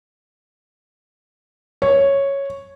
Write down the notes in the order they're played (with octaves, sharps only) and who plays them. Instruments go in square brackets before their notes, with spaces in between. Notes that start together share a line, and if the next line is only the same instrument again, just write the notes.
[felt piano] C#5